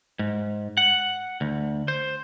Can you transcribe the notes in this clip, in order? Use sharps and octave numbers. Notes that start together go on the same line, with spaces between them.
G#2
F#5
D2
C5